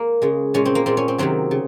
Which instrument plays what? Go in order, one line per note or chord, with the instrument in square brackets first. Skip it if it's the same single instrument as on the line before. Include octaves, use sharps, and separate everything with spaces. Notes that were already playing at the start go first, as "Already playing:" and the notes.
Already playing: [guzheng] A#3
C#3 G#3
A#2 G#3 C#4
C4
A#3
A#2 G#3 C4
C#4
C4
C3 D#3 F#3 C4
C#3